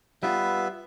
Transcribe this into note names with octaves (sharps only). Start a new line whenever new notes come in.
G3 B3 F4 B4 E5